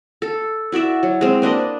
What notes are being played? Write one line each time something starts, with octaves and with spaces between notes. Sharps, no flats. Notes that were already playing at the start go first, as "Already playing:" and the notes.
A4
E4 F#4 D5 E5
F#3
G#3 C4
A#3 D4 B4 D#5